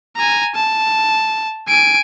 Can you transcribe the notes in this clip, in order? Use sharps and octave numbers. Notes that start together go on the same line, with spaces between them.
G#5 A#5
A5
G#5 D7